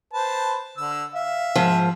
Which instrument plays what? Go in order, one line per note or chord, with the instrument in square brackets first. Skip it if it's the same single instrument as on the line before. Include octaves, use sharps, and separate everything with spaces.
[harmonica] B4 C5 A5
D3 E6
[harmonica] E5 [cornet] F5
[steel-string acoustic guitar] G#2 F3